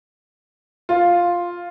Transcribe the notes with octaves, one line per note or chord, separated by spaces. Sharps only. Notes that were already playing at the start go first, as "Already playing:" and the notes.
F4